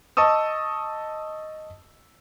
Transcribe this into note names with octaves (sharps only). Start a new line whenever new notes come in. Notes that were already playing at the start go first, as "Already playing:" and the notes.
D#5 A5 C#6 D#6 E6